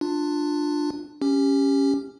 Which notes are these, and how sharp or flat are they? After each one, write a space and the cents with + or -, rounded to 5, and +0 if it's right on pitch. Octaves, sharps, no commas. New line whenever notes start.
D4 +15 F4 +10
C#4 +0 G4 +10